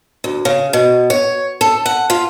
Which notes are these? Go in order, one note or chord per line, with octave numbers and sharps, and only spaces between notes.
D2
C#3
B2
C#5
A4
F#5
F4